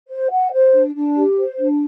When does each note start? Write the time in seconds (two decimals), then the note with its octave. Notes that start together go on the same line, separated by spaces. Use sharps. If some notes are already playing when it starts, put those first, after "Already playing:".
0.08 C5
0.30 F#5
0.52 C5
0.73 D4
0.95 D4
1.16 G4
1.37 C5
1.59 D4